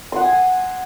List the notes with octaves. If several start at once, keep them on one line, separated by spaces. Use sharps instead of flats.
F#5 G#5 C6 D#6